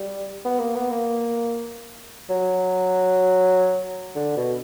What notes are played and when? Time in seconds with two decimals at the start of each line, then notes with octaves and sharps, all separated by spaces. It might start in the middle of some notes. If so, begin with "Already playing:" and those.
Already playing: G3
0.45 B3
0.59 A#3
0.75 B3
0.90 A#3
2.30 F#3
4.16 D3
4.37 B2